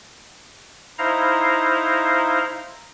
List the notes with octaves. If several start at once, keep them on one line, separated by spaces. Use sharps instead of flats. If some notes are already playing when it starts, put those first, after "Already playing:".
D#4 E4 C5 F5 A#5